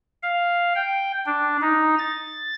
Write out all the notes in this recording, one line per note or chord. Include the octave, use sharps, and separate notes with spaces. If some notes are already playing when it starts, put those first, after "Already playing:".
F5
G5
D4
D#4
A6